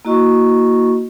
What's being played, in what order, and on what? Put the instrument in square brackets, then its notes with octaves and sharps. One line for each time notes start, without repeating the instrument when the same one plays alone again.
[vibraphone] A#3 E4 F#4 D#5 C#6